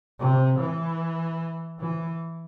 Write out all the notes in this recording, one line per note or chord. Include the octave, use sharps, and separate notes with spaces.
C3
E3
E3